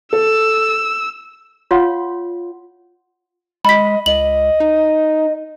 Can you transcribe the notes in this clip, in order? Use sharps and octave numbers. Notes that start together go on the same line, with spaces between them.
A4 E6
F4 C#5 F5 F#5 C6
G#3 D#5 B5 B6
C#2 D#5 F#7
D#4